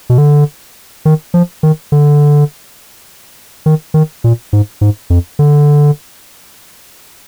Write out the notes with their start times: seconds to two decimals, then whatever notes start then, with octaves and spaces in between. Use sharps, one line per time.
0.10 B2
0.18 D3
1.05 D#3
1.34 F3
1.63 D#3
1.92 D3
3.66 D#3
3.94 D#3
4.24 A#2
4.53 G#2
4.81 G#2
5.10 F2
5.39 D3